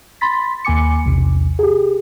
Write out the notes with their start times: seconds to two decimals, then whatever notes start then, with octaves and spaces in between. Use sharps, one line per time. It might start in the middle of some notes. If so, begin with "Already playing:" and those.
0.21 B5 C6 A6 B6
0.65 D#2 A#3 G#5 D6 C#7
1.05 B1 E2 C3
1.59 G4 G#4